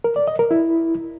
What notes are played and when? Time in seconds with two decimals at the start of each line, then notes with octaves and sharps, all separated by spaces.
0.04 A#4
0.16 D5
0.28 D#5
0.39 A#4
0.51 E4